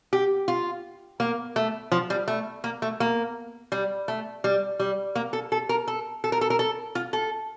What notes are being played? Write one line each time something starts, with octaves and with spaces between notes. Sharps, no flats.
G4
F4
A#3
A3
F3
G3
A3
A#3
A3
A#3
G3
A3
G3
G3
A#3
A4
A4
A#4
A4
A4
A#4
A4
A#4
A4
F4
A4